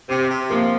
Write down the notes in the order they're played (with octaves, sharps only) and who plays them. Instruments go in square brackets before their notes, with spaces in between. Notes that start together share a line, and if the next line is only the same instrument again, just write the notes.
[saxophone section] C3 [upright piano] C4
[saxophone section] C3
[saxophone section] F3 [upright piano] A#3